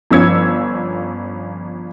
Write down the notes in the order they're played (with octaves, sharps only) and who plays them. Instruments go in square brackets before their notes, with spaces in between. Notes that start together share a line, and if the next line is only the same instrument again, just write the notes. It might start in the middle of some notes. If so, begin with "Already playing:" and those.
[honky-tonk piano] G1 F3 C#4 E6 G#6 C#7